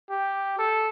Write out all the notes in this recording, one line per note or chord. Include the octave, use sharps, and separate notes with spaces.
G4
A4